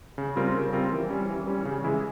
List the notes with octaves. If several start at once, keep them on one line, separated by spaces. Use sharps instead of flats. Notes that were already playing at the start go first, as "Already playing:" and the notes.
C#3
G3 C4 F4 A#4
C#3
G3 C4 F4 A#4
E3
G3 C#4
E3
G3 C#4
C#3
E3 G#3 E4 G#4